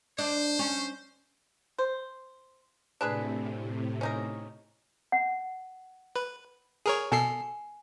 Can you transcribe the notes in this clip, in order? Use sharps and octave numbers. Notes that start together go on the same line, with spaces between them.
D4 C5
C#4
C5
A2 C3 D4 G#4 B4
C#4 D#4 A#4
F#5
B4
G#4 A#4 C#5
B2 A4 G#5 C7